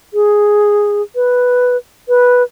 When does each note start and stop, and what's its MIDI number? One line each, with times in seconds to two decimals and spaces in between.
0.14 1.02 68
1.15 1.77 71
2.08 2.43 71